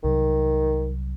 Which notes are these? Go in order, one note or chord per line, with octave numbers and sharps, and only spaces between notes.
C2 C3 D#3 F#3